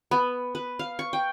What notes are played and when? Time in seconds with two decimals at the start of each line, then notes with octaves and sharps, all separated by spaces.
0.11 B3
0.55 B4
0.79 F5
0.99 C#6
1.13 G5